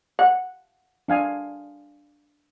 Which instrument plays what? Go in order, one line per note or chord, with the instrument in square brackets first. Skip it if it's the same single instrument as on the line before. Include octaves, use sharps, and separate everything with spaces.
[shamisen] F#5
[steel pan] D4 F5 G#5